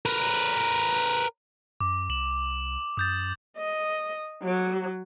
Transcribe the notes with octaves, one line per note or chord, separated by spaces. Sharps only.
A#4 B4
F#2 D6
C2 E7 F#7
F#2 D#6 G6 A6
D#5
F#3